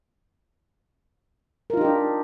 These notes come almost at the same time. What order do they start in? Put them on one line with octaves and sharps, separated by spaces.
A#4 F4 D#4 G4 D4